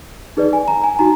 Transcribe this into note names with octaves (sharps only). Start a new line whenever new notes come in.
D#4 G#4 B4 D5
G#5
A#5
G#5
D#4 F#4 A#5